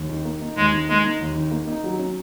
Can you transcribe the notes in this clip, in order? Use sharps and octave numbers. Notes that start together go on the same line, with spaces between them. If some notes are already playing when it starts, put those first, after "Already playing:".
Already playing: D#2
D#3
A#3
D#4
D#2 G#3
D#3
G#3 A#3
D#4
D#2
D#3
A#3
D#4
F#3
C#4